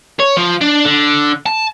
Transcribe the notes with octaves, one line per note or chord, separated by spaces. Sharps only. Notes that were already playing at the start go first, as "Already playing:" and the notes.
C#5
F3
D4
D3
A5